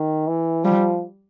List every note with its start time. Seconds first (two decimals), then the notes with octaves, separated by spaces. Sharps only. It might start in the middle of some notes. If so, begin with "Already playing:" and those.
Already playing: D#3
0.27 E3
0.64 F3 G3